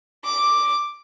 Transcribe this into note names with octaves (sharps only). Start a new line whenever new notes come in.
D6